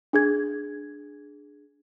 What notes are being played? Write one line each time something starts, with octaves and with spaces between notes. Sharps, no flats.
D4 G#4 G#6